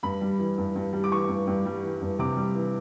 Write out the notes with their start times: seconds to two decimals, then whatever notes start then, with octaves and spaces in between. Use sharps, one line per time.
0.03 G2 B5
0.21 G3
0.39 E3
0.58 G2
0.75 G2
0.93 G3
1.04 D6
1.11 E3 C#6
1.29 G2
1.47 G2
1.66 G3
1.83 E3
2.02 G2
2.19 C3 D6
2.37 G3
2.55 E3